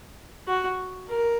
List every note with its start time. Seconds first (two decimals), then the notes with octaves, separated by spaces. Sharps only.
0.47 F#4
1.09 A#4